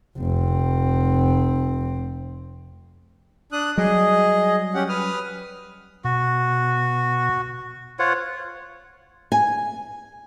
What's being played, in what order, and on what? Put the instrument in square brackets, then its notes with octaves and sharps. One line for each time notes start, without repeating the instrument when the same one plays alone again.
[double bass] F1 C4
[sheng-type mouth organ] D4 D#6 F#6
[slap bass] F#3 G3 [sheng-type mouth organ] G#4 D#5
[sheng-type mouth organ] C#4 G4 F#5
B4 D#6 F6
[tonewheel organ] B2 [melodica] F#4
[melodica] F4 C#5 F#5 [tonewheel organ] C5
[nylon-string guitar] G#5